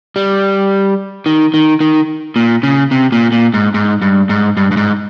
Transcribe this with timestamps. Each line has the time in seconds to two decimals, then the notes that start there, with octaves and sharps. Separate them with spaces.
0.16 G3
1.26 D#3
1.54 D#3
1.80 D#3
2.36 A#2
2.63 C#3
2.91 C3
3.12 A#2
3.32 A#2
3.54 G#2
3.74 G#2
4.01 G2
4.29 G#2
4.57 G2
4.71 G2
4.77 G#2